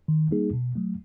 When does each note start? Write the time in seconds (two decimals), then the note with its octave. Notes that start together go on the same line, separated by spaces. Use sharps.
0.08 D#3
0.31 G3 A#3 D#4 G#4
0.53 B2
0.76 F#3 A3